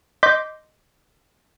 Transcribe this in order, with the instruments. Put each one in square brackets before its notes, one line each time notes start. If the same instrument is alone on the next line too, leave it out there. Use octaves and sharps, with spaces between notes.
[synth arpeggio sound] D#5 C6 D6 G6 B6